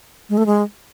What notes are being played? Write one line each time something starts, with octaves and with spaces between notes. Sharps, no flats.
G#3
A3
G#3